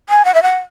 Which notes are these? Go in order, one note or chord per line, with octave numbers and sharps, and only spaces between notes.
G#5
F#5
E5
F#5